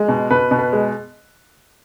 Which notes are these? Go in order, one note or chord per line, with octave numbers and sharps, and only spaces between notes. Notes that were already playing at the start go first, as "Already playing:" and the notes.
Already playing: G#3
B2
B2 B4
B2
B4
G#3